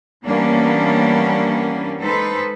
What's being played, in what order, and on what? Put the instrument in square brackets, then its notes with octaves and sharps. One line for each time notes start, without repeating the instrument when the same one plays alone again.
[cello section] E3 G3 A#3 B3 C#4 D4
G#3 D#4 A4 B4 C5